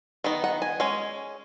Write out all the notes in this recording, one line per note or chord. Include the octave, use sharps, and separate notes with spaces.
D#3 B3 D#4
F#5
G#5
G#3 C#4